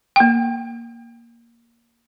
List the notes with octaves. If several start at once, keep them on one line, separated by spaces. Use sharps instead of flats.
A#3 G5